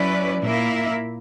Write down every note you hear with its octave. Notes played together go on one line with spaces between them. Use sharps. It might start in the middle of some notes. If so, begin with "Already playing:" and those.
Already playing: F#3 C#4 E4 B4 D5
A#2 A#3 E4 A#4 E5